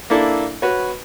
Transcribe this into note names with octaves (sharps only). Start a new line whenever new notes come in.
A#3 D4 E4 A4
F#4 B4 C#5